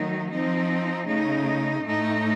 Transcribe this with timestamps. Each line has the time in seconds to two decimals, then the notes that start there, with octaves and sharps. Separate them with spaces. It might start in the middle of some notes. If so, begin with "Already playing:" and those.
Already playing: D#3 F#3 A3 D#4
0.32 F3 C4 D#4
1.08 C#3 A3 D#4
1.83 A2 A3 D#4